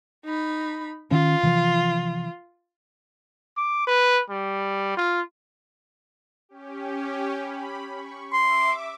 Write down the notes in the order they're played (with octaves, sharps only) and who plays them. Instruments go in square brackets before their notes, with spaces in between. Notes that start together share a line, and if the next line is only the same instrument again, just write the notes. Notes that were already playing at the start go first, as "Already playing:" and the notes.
[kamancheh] D#4 B5
[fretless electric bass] D#3 C#4 [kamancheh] F4
[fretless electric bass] C3 E3 F3
[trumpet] D6
B4
G3
F4
[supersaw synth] C#4 G4
B5
C#6
[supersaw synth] E5 D6 [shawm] C6